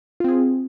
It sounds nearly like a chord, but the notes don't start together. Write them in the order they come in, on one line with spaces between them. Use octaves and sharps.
F4 C4 G#4